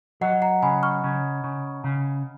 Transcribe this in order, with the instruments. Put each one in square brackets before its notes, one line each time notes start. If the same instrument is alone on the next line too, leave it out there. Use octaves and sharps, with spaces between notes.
[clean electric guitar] F#3 [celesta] D#5 F#5
[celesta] F#5 A#5
[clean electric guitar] C#3 [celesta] G#5 B5
[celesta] C#6 F6
[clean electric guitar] C#3
C#3
C#3